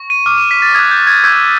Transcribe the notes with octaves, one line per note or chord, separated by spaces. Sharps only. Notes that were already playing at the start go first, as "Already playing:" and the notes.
Already playing: C#6
D#7
D6 F6
D#7
B6
A6
D#6 F#6 G#6
G6
G#6
C#6 E6 G6 G#6